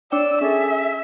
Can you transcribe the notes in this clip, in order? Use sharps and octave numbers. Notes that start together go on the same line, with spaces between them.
D4 C#5 D5 G5 E6
C#4 G#4 A4 E5